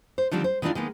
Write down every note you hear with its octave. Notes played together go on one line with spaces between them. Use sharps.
C5
D3 D#3 F3 G3 C4
C5
D#3 E3 G#3 A3 D4 F4
D#3 G#3 A#3 B3